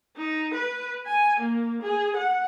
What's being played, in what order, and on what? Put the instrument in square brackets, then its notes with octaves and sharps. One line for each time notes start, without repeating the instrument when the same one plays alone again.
[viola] D#4
B4
G#5
A#3
G#4
F#5